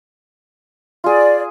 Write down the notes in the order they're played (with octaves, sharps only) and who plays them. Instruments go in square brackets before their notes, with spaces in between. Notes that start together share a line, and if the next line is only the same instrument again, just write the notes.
[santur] F4 G#4 [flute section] D5